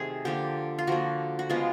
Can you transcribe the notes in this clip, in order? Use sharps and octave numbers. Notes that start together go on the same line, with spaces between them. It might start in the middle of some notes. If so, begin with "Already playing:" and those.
Already playing: C3 D#3 F#3 A3 G#4
D3 F3 A#3 G4
F4
D3 F3 A#3 F#4
F#4
C#3 F3 G#3 B3 F4